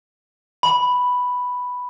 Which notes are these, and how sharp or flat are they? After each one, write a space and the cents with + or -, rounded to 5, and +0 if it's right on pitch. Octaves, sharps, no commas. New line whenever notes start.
B5 +0